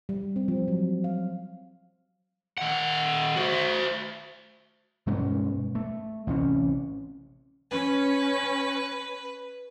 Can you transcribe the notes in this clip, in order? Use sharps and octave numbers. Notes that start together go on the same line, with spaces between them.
G3
C4
F3
F#3
F5
D#3 F#5
F#4 C5
G2 B2 G#3 C#4
A3
A1 C3 C#4
C#4 B4